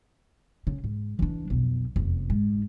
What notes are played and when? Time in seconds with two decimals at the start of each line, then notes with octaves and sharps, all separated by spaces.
0.67 C#3
0.84 G#2
1.19 E3 D4
1.50 B1 F2
1.96 F1 E2
2.30 G#2